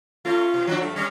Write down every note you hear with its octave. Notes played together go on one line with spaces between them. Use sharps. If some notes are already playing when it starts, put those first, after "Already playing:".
A3 C#4 F4
B2
F3 F#3 D4
G2 A3
G3 C#4